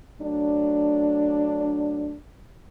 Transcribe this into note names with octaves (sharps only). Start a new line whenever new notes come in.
F#3 A3 D4